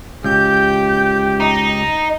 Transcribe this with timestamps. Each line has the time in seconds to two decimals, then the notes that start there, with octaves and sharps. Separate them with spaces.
0.24 C#2 G4 G6
1.40 D#4